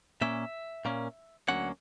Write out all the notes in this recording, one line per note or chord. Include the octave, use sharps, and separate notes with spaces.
A#2 A#3 C#4 E5
A#2 A#3 C#4
D2 D3 F#3 A#3 C#4 F#5